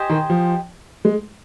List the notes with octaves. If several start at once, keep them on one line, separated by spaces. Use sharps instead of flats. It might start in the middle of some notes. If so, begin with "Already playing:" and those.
Already playing: G4 C5 D#5 G#5
D#3
F3
G#3